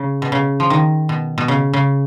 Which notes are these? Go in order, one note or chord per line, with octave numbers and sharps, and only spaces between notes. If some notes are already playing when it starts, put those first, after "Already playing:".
Already playing: C#3
B2
C#3
F3
D#3
B2
B2
C#3
C#3